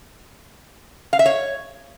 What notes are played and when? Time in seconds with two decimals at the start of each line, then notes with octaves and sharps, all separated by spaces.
1.13 F5
1.19 E5
1.26 C#5